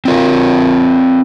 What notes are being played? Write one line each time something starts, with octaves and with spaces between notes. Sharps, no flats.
C4 F4 A#4